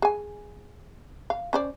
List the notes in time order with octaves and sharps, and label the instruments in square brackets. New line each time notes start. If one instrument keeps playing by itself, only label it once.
[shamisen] G#4 G#5
F5
C#4 C5 D5